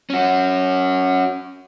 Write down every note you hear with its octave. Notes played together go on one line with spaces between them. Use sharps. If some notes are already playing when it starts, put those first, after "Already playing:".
C#4 F#4